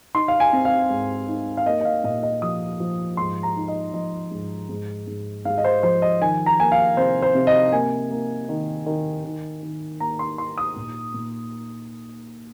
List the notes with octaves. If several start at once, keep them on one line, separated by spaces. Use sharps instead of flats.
D#4 C6
F5
G#5
C4
F5
G#2
D#4
F5
A#3 D#5
D#5
F5
A#2 D#5
D#5
F3 D#6
F3
G#2 C6
A#5
D#4
D#5
F3 D#5
G#2
G#2
G#2
G#2 F5
D#5
C5
F3 C5
D#5
D#3 G#5
A#5
A#3 G#5
F5
C3 C5
C5
C3
D#5
A#3 G#5
A#3
D#3
D#3
D#3
D#3
A#3 A#5
C6
D#4 C6
D#6
A#2
A#2